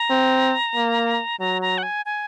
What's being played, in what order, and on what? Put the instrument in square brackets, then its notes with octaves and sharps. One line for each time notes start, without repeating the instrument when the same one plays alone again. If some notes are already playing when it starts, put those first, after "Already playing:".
Already playing: [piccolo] A#5
[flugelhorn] C4
A#3
[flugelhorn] F#3 [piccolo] A#5
[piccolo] A#5
F#5
G#5
G#5